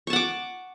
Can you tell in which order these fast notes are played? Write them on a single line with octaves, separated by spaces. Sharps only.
C#6 A5 F#5 D6